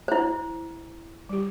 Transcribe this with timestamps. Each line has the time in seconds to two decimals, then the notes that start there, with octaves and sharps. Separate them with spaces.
0.08 E4 C5
1.29 G3 G4